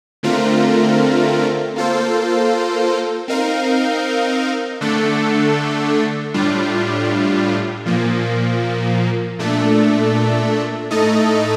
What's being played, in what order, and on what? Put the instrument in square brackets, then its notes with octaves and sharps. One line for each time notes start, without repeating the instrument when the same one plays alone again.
[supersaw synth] D3 A3 C4 F4 A#4
A#3 F4 A4 C5
C4 D#4 A#4 F5
D3 A3 D4 A4
A2 G3 D4 F4
A#2 F3 A#3
A#2 A3 D4 A4
A2 A3 D#4 A4 D#5